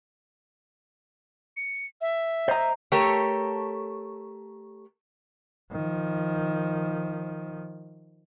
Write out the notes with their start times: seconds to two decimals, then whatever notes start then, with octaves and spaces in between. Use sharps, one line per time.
1.57 C#7
2.01 E5
2.48 C5 D#5 A#5
2.92 A3 G4 A4 A#4 C#5
5.71 D#3 F3